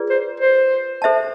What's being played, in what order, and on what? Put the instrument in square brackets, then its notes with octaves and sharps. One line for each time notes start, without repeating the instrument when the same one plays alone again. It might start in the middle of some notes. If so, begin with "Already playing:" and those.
Already playing: [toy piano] F4 G#4 B4 D5
[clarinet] C5
C5
[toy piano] A4 C5 E5 A5